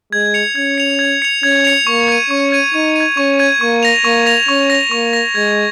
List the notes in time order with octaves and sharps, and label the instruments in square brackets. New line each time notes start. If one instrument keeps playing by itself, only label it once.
[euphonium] G#3 [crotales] G#6
[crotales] C#7 F7
[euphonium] C#4 [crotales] G#6
[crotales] C#7 F7
G#6
C#7 F7
[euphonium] C#4 [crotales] G#6
[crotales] C#7 F7
[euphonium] A#3 [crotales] C#6
[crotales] G#6 D#7
[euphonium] C#4 [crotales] C#6
[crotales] G#6 D#7
[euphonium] D#4 [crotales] C#6
[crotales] G#6 D#7
[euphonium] C#4 [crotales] C#6
[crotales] G#6 D#7
[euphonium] A#3 [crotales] C#6
[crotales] A#6 F7
[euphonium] A#3 [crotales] C#6
[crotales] A#6 F7
[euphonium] C#4 [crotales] C#6
[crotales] A#6 F7
[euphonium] A#3 [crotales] C#6
[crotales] A#6 F7
[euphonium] G#3 [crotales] G#6